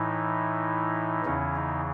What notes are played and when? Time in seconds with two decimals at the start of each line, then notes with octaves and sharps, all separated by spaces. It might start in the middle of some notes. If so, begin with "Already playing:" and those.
Already playing: A2 E3 D#4
1.25 E2 C#3 E3 C#4
1.56 D#4